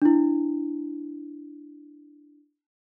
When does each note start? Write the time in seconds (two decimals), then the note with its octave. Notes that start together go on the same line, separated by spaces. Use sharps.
0.02 D4 E4